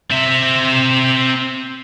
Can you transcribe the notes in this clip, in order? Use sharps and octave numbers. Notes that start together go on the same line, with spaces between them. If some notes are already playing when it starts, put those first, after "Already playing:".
C4 E5